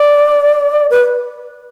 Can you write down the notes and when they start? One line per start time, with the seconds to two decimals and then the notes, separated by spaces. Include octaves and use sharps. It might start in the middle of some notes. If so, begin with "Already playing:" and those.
Already playing: D5
0.90 B4